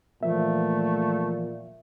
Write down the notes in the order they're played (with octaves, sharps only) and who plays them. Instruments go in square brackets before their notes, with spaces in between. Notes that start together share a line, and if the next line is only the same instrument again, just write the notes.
[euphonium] A#2 [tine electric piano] E3 F3 A#3 [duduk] A3 [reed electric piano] E5